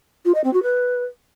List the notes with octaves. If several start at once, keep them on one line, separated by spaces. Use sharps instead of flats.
F4
D#5
C4
F#4
B4